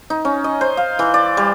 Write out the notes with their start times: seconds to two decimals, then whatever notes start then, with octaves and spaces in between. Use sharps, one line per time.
0.10 D#4
0.25 C#4
0.44 D#5
0.61 C5
0.77 F5
0.99 E3
1.14 D5
1.37 G3